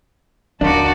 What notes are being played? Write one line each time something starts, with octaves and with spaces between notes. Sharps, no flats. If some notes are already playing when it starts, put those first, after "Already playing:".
D#2 D3 A#3 D4 D#4 F#4 A5 D6